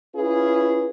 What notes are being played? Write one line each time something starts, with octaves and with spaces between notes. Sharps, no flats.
C#4 E4 F4 G#4 B4